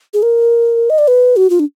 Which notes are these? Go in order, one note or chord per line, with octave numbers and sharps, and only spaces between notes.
G#4
A#4
D#5
D5
B4
F#4
F4
D4